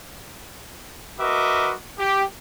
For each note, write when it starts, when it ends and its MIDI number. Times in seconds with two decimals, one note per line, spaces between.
1.20 1.74 66
1.20 1.74 70
1.20 1.74 71
1.20 1.74 75
1.20 1.74 76
1.20 1.74 86
1.99 2.24 67